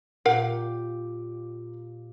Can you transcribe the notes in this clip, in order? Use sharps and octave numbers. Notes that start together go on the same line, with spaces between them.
A#2 G4 A#4 F5 F#5